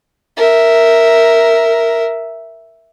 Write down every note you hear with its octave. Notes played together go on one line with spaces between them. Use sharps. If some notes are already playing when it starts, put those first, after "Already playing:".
A#4 E5